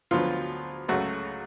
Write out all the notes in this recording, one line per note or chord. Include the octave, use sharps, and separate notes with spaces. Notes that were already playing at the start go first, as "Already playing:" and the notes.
D2 D3 F3 F#3 B3 F4
C#2 C#3 F#3 A3 F#4